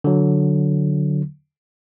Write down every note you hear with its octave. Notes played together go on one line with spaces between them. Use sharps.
D3 F#3